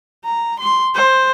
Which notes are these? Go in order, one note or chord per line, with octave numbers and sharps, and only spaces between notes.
A#5
C6
C5